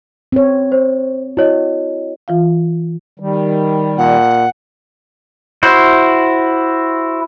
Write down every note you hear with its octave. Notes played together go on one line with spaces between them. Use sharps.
C4 C#5
C5
E4 F#4 C#5 D#5
E3 F4 F5
D#3 G3
A#2 F#5
E4 F#4 C5